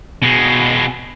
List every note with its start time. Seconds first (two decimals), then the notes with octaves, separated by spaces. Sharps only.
0.22 B2 G#3